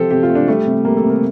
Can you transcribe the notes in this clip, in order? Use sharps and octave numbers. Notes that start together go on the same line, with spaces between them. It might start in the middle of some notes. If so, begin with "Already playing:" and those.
Already playing: C3 F3 G4 A4 C5
C3 G4
F4
A3
D4
G3 A3
C3
G3 A#3
A4
C3
A#4